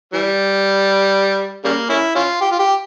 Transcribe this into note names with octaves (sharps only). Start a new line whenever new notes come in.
E3 G3
C#3 G3 A#3
C#4 E4
C#4 F4
G4
F4
G4